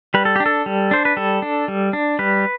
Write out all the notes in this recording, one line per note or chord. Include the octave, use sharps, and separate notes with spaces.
G3 B4
A4
D4 G4
A4
G3
D4 C5
B4
G3 A4
D4
G3
D4
G3 B4